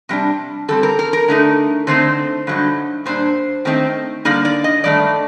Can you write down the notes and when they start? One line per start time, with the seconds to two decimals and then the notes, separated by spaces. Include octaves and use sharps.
0.09 C3 G3 D4
0.68 D3 G3 C4 A4
0.83 A#4
0.99 A#4
1.13 A#4
1.28 D3 A3 D#4
1.87 D3 A3 C4 D#4 C5
2.47 G2 D3 F#3 A3 D#4
3.06 A#2 G3 D4 C5
3.65 D#3 A3 C4 D#4
4.25 D3 G3 A#3 D#4 D5
4.45 D5
4.64 D#5
4.84 G2 D#3 A3 D4 D5